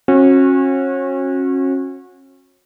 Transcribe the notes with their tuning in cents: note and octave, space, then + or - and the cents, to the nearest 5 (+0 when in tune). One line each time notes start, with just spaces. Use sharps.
C#4 -35 F#4 -25